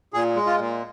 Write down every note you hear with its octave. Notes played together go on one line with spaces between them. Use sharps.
A#2 G#4
G#3
F4
A#2